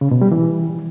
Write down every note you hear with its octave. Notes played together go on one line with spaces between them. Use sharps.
C#3
B2
G3
E3